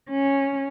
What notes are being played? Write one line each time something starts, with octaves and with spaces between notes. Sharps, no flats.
C#4